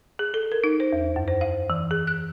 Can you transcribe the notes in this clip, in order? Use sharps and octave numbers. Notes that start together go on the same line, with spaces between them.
G#4
A4
A#4
D#4
C5
E2
F#2
C5
F5
E3
G#4
F#6